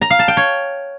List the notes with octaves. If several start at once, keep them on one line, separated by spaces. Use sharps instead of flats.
A#5
F5
A5
G5
C#5